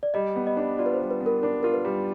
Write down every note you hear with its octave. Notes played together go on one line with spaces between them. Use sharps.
D5
G3 D#5
B3
D#5
D4
F4 D5
B4
C5
G3
B4
B3
A#4
D4 A#4
F4 A#4
B4
G3